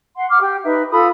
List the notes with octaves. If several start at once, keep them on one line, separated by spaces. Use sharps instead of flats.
F#5 C6
F#5 D6 F6
G4 G5
D#4 B4 E5
F4 A4 B5 D#6